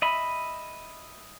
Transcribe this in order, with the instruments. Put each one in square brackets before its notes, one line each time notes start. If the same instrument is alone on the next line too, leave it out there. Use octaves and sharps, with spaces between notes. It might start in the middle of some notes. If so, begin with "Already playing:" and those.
[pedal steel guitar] D#5 E5 B5